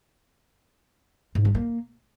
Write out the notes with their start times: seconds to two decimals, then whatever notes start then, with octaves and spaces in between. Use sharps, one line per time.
1.35 G#2
1.45 G#3
1.55 A#3